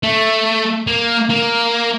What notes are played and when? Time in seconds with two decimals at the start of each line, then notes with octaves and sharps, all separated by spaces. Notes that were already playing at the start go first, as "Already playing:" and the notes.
0.03 A3
0.87 A#3
1.29 A#3